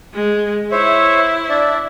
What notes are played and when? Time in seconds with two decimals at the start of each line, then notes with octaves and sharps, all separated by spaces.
0.14 G#3
0.72 E4 C5 C#5 E5
1.49 D4 D5 E5